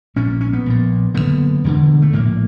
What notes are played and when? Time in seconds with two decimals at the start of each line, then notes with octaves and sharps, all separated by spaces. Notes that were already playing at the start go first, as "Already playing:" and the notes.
0.16 A#1 A#2 C#4
0.41 C#4
0.53 B3
0.66 A#1 A#2
1.14 F#1 F2 D3 B3
1.64 E1 D2 D3
2.02 A3
2.13 A#1 A2 A#3